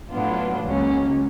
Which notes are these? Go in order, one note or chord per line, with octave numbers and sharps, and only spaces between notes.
A2 F#3 B3 D4 F4
C#2 C#3 F#3 A#3 C#4